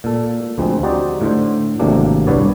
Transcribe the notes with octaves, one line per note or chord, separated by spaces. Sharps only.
A#2 A4
D2 F3 G#3 C4
D#4 F#4 G4 C5 D5
A2 D3 C5
G#1 A2 C3 F#3 A#3 D4
C2 G2 B3 C#5 D5